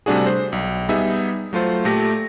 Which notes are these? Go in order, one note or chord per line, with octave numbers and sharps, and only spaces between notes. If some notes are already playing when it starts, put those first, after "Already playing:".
C3 G3 A3 D4 F#4 G#4
C5
B1
G3 B3 D#4 G#4 E5
F#3 A3 F4 C5
A#2 A3 G4 A#6